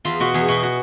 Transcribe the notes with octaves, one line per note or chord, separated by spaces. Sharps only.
E2 F4
B2 F#4
E2 G#4
B2 F#4
F#4